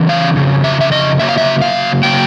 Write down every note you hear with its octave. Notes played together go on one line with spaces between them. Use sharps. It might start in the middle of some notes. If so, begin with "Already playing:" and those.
Already playing: C#3 E3
F5
F2 C#3
E5
E5
D#5
C#3 F#3 A#3 E5
F5
E5
F5
C#3 F#3 A#3 G5